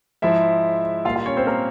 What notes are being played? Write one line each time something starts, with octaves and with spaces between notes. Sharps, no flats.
G#2 F3 G#3 E4 E5
A#2 G3 A#3 F4 F5
F4 F5
C#4 C#5
C4 C5
A#3 A#4